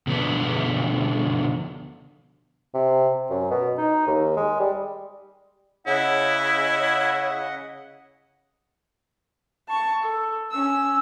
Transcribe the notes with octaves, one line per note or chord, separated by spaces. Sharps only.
B2 D3 F3 B3 D4 B4
C3
F#2
B2
D#4
D#2
G#3
G3
C#3 E4 D#5 F#5
A5 C#6
A4
C#4 E6